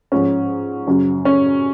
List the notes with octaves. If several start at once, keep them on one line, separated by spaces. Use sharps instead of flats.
G#2 F3 C#4
F#2 C#3 F#3
C#4